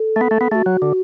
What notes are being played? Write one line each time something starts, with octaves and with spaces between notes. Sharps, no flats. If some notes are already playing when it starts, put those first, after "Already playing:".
Already playing: A4
A3
B3
A3
B3
A3 F#4 G#4
F#3
D3